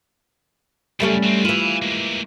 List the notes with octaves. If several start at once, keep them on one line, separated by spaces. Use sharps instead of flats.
F#2 C#3 G3 A3 C#4
F#3 C4
E3 F4 G#5 B5
G#3 A#3